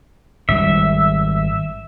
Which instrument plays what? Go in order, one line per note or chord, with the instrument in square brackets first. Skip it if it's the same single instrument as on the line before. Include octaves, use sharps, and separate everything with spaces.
[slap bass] G#1 G3 [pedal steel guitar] E5